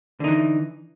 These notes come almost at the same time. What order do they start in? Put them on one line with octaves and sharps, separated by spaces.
D3 D#4 E3